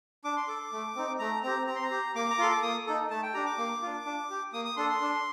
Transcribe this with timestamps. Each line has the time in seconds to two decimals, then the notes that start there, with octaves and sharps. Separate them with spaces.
0.24 D4 D6
0.36 C6
0.47 A4 D6
0.72 A3
0.96 C4 D#4
1.19 A3 A#5
1.43 C4 G4 A#5
1.67 C4 A#5
1.76 C6
1.84 A#5
1.91 G4
2.15 A#3 D6
2.30 A#5
2.38 F4 A4 C6
2.51 D6
2.62 A#3 D#6
2.86 D#4 A4
3.10 A3 A5
3.23 G5
3.34 D4 G4 A#5
3.46 D6
3.58 A#3
3.82 D4 F4
4.05 D4
4.30 G4
4.53 A#3 D#6
4.65 D#6
4.77 D4 A4 C6
4.89 C6
5.01 D4